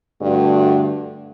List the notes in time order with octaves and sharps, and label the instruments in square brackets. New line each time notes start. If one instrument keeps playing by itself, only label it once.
[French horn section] G2 D3 A3 D4 F#4